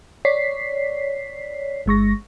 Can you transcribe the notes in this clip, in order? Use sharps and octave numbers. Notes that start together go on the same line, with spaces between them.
C#5 D5 B6 C7
G1 G#3 C#6 A#6